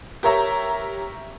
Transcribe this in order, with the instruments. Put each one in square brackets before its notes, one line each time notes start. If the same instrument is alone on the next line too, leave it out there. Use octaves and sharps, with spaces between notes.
[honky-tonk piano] G4 A#4 C#5 E5 A#5